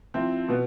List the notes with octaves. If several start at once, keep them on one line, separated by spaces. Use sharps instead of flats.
F3 C4 E4
B2 B3